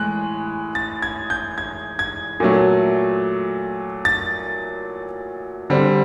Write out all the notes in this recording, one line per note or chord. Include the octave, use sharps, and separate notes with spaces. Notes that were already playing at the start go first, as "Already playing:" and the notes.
Already playing: A2 E3 G#3 F#6
A6
G#6
G6
G#6
G#6
A#2 F#3 A3
A6
D3 G3 C4